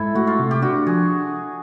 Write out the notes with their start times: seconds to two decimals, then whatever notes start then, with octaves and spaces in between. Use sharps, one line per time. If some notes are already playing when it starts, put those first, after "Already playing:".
Already playing: G#2 E4 A4
0.15 A3 F#4
0.27 F4
0.39 C3
0.51 G4
0.62 D4 F#4
0.86 F3 G#4